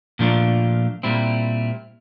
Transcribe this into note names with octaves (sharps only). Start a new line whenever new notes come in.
A#2 F3 A3 D4 F4
A#2 G3 C4 E4